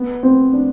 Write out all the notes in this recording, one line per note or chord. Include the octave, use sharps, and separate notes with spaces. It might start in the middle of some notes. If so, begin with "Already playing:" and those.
Already playing: B3
C4
D4